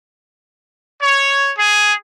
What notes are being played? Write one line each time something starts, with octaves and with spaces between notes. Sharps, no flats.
C#5
G#4